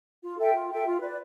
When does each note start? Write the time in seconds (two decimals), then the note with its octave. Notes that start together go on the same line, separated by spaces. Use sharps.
0.23 F4
0.39 A4 E5 G5
0.54 F4
0.70 A4 E5 G5
0.85 F4
1.01 B4 D5